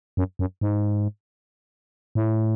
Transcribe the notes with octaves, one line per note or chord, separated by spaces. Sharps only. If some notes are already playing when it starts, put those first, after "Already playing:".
F#2
F#2
G#2
A2